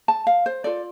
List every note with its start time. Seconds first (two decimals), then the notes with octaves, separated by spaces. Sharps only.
0.08 A5
0.27 F5
0.46 C5
0.64 F4 A4 D5